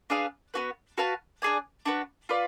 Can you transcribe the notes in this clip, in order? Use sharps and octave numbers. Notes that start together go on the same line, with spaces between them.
D4 G#4 B4 F5
B3 D4 F#4 B4
F#4 B4 F5 A5
D4 G#4 D5 G#5
D4 F#4 B4
F4 B4 D5